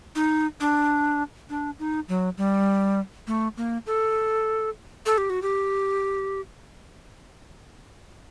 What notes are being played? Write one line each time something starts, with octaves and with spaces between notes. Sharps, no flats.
D#4
D4
D4
D#4
F#3
G3
A3
A#3
A4
A4
G4
F#4
G4